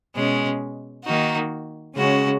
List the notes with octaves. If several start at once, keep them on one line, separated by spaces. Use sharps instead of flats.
B2 G#3 C#4
D#3 A#3 D#4 F#4
C#3 G#3 C#4 F#4